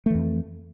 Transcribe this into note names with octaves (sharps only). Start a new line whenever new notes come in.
F2 E3 A3